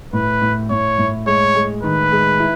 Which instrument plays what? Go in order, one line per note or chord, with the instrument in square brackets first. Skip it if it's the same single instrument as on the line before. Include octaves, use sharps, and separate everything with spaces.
[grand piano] A2 [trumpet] B4
[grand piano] A2
[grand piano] A2 [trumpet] C#5
[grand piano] A2
[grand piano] G#3 [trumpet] C#5
[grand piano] G#3
[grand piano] D#3 [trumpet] B4
[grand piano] G#3
E4